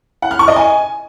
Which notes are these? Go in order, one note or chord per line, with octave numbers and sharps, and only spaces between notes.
F#5
F6
C#6
D#5
G#5